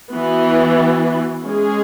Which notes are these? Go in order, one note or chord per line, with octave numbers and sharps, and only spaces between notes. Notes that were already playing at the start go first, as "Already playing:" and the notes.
E3 B3 F#4
G#3 C#4 G#4